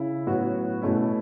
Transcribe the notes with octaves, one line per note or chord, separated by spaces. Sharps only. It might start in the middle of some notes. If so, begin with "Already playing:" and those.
Already playing: C#3 E4
A2 F#3 B3 F#4
B2 A3 C#4 E4